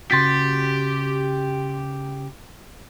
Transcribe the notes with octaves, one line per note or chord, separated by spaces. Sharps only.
C#3 F#4 G4 C6 A6 B6